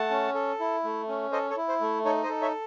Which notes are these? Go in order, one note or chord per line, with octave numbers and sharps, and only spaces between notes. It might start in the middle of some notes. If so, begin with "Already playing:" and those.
Already playing: A3 F#5 A5
C#4
A4
E4
A3
C#4
A4 C5 D#5
A4 C#5
E4
C5
A3
D#4 A4 C#5
C5 D#5
A4
C#5 E5